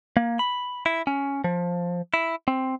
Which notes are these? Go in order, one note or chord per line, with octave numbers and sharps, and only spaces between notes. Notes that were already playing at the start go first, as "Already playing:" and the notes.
A#3
B5
E4
C#4
F3
E4
C4